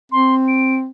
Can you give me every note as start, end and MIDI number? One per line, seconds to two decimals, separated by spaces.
0.12 0.88 60
0.12 0.35 84
0.48 0.75 98